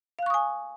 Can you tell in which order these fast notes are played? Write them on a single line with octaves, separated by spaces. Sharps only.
F5 F#6 C#6 D#6 G#5